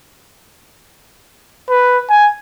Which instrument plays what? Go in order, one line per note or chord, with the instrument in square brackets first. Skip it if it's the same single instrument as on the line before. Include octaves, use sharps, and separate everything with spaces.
[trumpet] B4
G#5